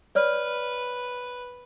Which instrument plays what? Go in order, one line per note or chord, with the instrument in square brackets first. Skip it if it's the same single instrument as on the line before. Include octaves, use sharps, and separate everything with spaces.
[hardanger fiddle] B4 [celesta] C#5 D5 F6